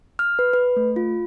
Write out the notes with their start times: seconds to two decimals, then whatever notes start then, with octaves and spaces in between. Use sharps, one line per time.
0.19 F6
0.39 B4
0.53 B4
0.76 A3
0.96 F4